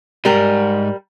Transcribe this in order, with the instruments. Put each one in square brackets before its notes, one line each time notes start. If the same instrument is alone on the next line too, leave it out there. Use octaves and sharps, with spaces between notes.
[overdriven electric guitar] G#2 [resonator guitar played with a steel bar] G3 A#4